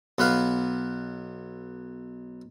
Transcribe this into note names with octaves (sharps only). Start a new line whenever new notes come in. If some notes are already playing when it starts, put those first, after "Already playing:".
B1 B3 B4 F5